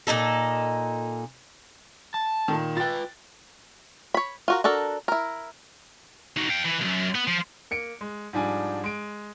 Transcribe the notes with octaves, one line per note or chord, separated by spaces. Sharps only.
A#2 E3 D#4 A4
A5
A#2 D#3
F4 B4 G5 A6
C#5 B5
F4 F#4 A#4
D4 F#4 A4 A#4
E4 A#4
D#4 F#4
F5 G5
E3
C2 F#2
B3
F3
A#3 C#7 D7
G#3
G#2 F3 G3 D4 G#5
G#3 D7